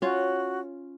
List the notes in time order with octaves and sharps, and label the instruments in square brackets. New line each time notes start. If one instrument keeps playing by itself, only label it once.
[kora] C#4 F4 [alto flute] F#4